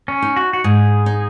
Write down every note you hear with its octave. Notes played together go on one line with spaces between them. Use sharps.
C#4
D#4
F#4
F#4
G#2 G#4
D#4